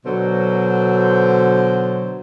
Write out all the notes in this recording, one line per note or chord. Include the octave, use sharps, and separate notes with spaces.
B2 D3 F#3 C5